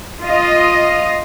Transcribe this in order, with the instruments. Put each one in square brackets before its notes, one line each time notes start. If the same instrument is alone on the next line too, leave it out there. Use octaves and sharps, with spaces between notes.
[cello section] F4 D#5